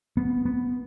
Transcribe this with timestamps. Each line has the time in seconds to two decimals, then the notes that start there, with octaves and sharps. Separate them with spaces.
0.17 B3
0.45 B3